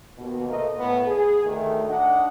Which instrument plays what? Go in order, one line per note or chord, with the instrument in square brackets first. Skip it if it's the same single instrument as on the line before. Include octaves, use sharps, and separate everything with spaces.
[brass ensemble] D#2 B2
A3 A#3 A#4 C5 D#5 F5
A2 B3 B4
G#4
D2 D#3 A3
D4 D#4 D#5 F#5